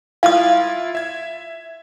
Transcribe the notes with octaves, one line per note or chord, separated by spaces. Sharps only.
E4 F4 F5 D#6
E5 G#6